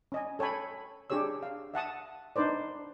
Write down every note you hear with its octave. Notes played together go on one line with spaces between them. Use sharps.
C#4 D#5 G#5
A4 C#5 G5 G#5 B5
D4 G4 G#4 C#5 E6
F5
E5 F#5 A5 D#6
D4 D#4 B4 C5 D5